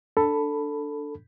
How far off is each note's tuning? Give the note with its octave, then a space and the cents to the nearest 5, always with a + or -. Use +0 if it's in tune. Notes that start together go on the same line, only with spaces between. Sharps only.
D4 +0 A4 +10 B5 +0